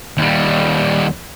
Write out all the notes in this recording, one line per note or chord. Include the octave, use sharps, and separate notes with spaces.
D#2 G3